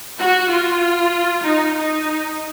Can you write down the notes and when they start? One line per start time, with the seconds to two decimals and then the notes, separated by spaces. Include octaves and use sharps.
0.19 F#4
0.50 F4
1.44 D#4
1.76 D#4